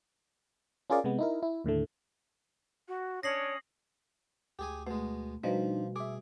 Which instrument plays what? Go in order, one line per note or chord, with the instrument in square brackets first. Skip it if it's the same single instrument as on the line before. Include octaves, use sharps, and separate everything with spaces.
[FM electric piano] C#4 F4 G#4 A#4 D5 F5
C3 G#3 B3
D#4 E4 A#4
E4
D#2 A2 D3 A3
[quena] F#4
[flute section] C#4 D4 C#5 [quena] D#6 [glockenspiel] A#6 C7 F#7
[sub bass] D2 [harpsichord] G4 G#4 G#5
[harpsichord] B2 G#3 [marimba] A3
[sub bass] B2 [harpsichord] F3 [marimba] G3 F#4 B4 [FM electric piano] D4 D#4
[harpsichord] G#4 [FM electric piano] E5 D6